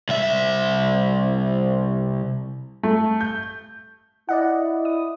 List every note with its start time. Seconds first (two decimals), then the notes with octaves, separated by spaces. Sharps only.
0.09 C2 E5
2.83 A3
3.21 G6
4.29 E4 D5 D#5 F#5
4.85 D#6